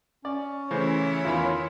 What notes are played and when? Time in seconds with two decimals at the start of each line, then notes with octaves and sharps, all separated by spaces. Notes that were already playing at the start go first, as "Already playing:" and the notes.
0.25 C#4 D5
0.71 C#3 E3 A3 E4 C5 C#5
1.24 E2 D#3 F4 B5